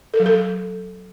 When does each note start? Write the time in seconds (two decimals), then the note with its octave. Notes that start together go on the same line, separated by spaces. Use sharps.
0.14 A4
0.20 F#3
0.26 A4